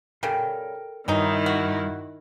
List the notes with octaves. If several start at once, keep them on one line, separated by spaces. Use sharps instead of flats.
C#3 G3 A4 A#4 G5
G2 D#3 E3 F#3 D#4 E4
F#4